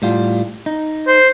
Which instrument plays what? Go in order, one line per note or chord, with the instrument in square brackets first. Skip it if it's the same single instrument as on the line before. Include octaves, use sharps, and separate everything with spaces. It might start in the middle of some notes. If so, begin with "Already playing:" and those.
[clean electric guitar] A2 G3 F4
D#4
[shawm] C5